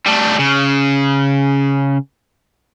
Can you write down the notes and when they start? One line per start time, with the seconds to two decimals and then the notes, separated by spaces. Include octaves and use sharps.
0.06 G3 A3
0.39 C#3